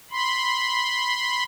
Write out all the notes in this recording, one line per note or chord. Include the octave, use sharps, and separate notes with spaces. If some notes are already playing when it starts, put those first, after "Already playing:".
B5 C6